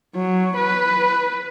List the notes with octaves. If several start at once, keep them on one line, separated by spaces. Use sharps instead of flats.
F#3
B4